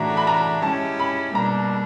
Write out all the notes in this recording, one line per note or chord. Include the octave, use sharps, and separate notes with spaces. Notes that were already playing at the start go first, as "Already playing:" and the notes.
Already playing: A2 E3 A3 D4 F#4 A#5
B5
A#5
G#3 C#4 E4 G4 A5
B5
B2 G3 A#3 D4 A#5